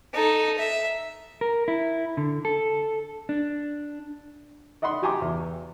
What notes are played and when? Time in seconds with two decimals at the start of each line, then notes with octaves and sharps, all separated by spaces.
0.14 D#4 A4
0.58 E5
1.41 A#4
1.68 E4
2.17 D3
2.45 A4
3.29 D4
4.82 D5 D#5 F#5 B5 C6
5.02 F#4 G4 G#5 A#5 C6 D6
5.22 E2